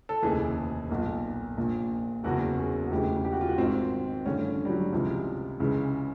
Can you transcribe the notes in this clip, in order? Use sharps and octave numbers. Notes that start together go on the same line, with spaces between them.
A4
F1 D#2 C#3 E3 G#4
B1 A#2
A#1 A#2
F#1 E2 C#3 F#4
G#4
F#4
E1 D2 C#3 E3 G4
G4
F#4
F4
F#4
G#1 G#2 D#3 C4
A1 G2 D3 C#4
G3
F#3
C#2 C3 E3 F3
C#2 C#3 E3